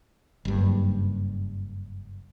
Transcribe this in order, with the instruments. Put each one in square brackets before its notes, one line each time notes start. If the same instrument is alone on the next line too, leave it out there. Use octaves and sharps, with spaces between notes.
[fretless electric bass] F#1 G2